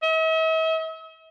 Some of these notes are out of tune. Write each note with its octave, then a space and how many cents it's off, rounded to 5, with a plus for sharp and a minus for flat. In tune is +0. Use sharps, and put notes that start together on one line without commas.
E5 -45